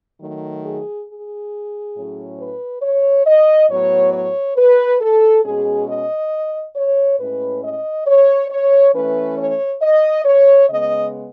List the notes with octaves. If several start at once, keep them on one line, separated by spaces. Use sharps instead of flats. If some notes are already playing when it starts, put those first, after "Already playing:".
D#3 F#3 A3
G#4
G#4
A2 F#3 C#4
B4
C#5
D#5
A2 F#3 B3 C#5
C#5
B4
A4
B2 G#3 C#4 G#4
D#5
C#5
A2 G#3 C#4 B4
D#5
C#5
C#5
E3 A3 C#4 B4
C#5
D#5
C#5
C#3 G#3 B3 D#5